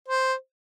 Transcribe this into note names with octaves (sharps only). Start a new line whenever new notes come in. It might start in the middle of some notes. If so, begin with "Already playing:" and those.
C5